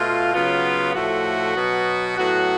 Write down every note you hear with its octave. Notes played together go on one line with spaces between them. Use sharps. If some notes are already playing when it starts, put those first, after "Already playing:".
Already playing: B2 A3 F4
C#3 F#3 B3 F4
A2 F3 A3 F#4
B2 F#3 B3
A2 F#3 B3 F#4